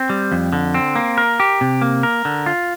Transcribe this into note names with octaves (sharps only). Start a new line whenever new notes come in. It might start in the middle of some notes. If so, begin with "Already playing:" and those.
Already playing: C4
G3
F2
D3
C4
A#3
A#4
G4
C3
A#3
A#4
D3
F4